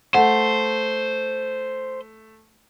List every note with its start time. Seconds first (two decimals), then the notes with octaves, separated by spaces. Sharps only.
0.14 A3 C5 F#5